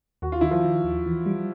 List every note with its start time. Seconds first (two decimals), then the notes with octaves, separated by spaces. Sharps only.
0.22 D#2 F#4
0.32 F4
0.41 D#3 E4
0.51 F3 F4
0.64 D#3
0.84 D#2
1.06 E3
1.26 G3